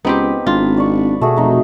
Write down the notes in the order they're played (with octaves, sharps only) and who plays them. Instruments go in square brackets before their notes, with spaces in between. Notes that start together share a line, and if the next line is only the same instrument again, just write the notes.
[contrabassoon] C#2 [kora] B3 C4 G4 [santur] D#4 B4
[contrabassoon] G#1 [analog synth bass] D4 [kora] F4
[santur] D5 C#6
[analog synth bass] B2 [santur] A3 F#4 G#4
[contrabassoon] F1 [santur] F#3 D#4